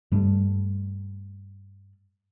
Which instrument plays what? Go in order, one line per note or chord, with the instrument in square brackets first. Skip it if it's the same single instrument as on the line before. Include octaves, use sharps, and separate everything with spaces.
[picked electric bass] G2 G3 A3